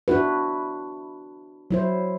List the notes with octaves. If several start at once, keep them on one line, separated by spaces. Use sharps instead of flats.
D4 E4 F#4 B4
F#3 E4 C5